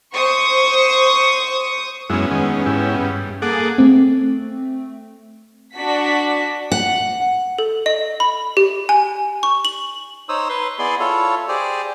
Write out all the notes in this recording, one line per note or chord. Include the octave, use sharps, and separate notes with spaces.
C5 C#6 D#6
F#2 G#3 B3 C#4 E4
D#3 G#3
G#2 E4 G4
G2
A#3 G#4 A4 F#5 D6
A3 C4
D4 F#4 B6
F#5
A4
D#5
B5
G4
G#5
C#6
F#7
D#4 C5 C#5 D#6 E6
B4 C6
B3 E4 G#4 D5 C6
E4 F4 A4 C#5
G4 G#4 C5 D5